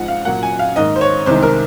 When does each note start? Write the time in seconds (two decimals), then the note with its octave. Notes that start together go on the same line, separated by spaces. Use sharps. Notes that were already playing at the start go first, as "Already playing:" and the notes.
Already playing: G#2 F3 G#3 F#5
0.08 F5
0.25 A#2 F#3 A#3 F#5
0.43 G#5
0.59 F5
0.76 G#2 D#3 A#3 D#5
0.96 C5
1.01 C#5
1.26 C2 C3 D#3 G#3 C5
1.43 A#4